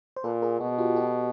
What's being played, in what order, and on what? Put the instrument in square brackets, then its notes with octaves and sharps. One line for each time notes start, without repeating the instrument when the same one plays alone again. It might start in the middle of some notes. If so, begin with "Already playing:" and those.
[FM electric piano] C5
[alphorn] A#2 [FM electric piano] A4 B4
[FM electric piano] G#4 A#4
[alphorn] B2 [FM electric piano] F#4
[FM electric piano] F4 G4
G4 A4